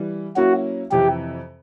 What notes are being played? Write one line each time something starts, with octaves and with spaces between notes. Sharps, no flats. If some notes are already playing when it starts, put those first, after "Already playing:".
Already playing: E3 G3
F#3 A#3 C#4 E4 F#4
F2 C3 E3 G4